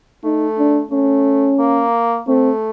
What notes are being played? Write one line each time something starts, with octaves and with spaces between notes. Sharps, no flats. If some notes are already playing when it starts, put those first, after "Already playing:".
A3 D#4
D4
A3 C#4
A#3
A3 C4